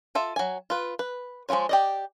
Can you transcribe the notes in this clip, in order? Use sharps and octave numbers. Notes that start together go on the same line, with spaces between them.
F4 A4 E5
F#3 G#5
F4 B4
B4
F3 G#3 E4 F4 C#5
G4 D5 D#5